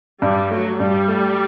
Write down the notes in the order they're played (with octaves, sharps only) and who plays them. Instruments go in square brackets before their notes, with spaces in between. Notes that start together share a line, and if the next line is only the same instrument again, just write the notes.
[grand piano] G2 [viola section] G3
[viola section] F#3 [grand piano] A3
[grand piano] G2 [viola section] G3
[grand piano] A3